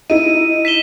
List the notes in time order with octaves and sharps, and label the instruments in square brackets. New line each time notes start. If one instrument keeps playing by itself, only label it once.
[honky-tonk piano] D#4 E4 [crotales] D#7
[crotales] B6 E7 G7